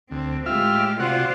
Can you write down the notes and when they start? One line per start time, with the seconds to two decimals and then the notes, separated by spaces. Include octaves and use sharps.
0.11 D2 C4
0.46 A2 G#3 F4 G4 E5 F6
1.00 C3 F4 F#4 C5 D5 F#5